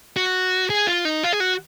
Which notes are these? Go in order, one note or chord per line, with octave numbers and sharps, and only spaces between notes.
F#4
G#4
F4
D#4
F4
G#4
F#4